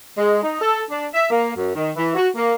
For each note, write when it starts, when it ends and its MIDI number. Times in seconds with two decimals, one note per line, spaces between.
0.18 0.42 56
0.43 0.61 63
0.61 0.81 69
0.90 1.06 62
1.14 1.27 76
1.30 1.51 58
1.55 1.70 42
1.75 1.90 51
1.96 2.13 52
2.15 2.28 66
2.35 2.53 58